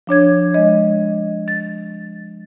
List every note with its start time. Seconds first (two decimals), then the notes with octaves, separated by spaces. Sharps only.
0.07 F3 D4 C#5 G#6
0.54 G#3 D#5
1.48 A6